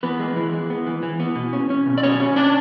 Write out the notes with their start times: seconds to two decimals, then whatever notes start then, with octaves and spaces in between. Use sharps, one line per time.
0.03 E3 B3 B4
0.19 G#3
0.36 E3
0.53 G#3
0.70 B3
0.87 E3
1.03 E3
1.20 B3
1.36 B2
1.53 C#4
1.70 C#4
1.86 B2
1.98 D5
2.03 B2 C#4 C#5
2.20 C#4
2.36 C#4 D4 D5